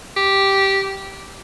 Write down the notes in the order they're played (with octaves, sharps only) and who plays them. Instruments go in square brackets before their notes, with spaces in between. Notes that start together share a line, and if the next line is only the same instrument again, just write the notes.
[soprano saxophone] G4